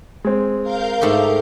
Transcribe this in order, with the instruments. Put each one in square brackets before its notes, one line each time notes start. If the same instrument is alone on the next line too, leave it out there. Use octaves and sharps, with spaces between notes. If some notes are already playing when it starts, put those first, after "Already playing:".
[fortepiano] G#3 C4
[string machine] A#4 F5 G6
[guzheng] G#2 A3 G4